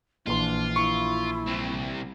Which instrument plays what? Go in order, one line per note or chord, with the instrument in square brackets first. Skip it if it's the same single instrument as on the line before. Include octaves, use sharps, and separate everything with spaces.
[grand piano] A#1 E3 C6 [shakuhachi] D4 [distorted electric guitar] F4
[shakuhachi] E4 [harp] C#6
[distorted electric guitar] C2 C3